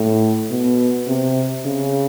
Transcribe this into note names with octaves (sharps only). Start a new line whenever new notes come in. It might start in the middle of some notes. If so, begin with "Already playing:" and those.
Already playing: A2
B2
C3
C#3